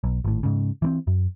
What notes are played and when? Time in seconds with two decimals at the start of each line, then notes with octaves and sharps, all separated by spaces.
0.04 B1
0.24 G#1 A2
0.43 G#2 C#3
0.82 E3 B3 C4
1.07 F#2